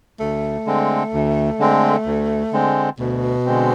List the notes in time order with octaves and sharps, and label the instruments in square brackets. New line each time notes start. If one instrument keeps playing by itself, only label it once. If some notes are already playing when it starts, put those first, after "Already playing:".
[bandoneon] D2 [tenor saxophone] A3
[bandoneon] D3 G#3 C4
D2
D3 G#3 C4
D2
D3 G#3 C4
[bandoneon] D2 [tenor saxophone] B2
[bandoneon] D3 G#3 C4